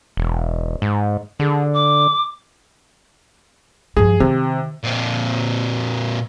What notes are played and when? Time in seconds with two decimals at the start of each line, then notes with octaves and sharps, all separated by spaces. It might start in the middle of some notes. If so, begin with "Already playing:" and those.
0.17 E1
0.82 G#2
1.40 D3 G#4
1.74 D6
3.97 G2 F3 G#4
4.20 C3 D#3
4.84 A#2 C4